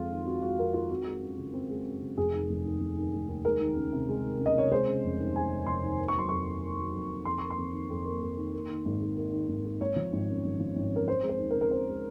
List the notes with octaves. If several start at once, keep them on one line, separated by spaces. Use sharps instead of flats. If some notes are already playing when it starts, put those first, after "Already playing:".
Already playing: F2 G#3 C4 F4
D#3
C4 F#4
G#3 F#4
F2 A#4
D#3 F4
C4 F#4
G#3
F#2
C#3
C4
G#3
F#2
C#3
F1 G#4
D#3
F1
D#2
F1
D#3
F1
D#2
G#3 A#4
D#3
C#2
C3
G#3
D#3
C#2
D#5
C3 C#5
G#3 C5
C#3
F1
D#2
G#3 G#5
C#3
F1 C6
D#2
A#3
C#6
F#3 C6
F2 C#6
D#3
A#3
F#3
F2
D#3
F2 C6
A#3 C#6
C6
F2
D#3
F2
A#3
F2
D#3
A#3
D#3
G#1
G#2
A#3
D#3
G#1
G#2
G#1 C#5
F3
G#1
F#2
G#1
F3
G#1
F#2 A#4
C4 C5
G#3
C5
D#2
A#4
C#3
A#4
C4 C5
G#3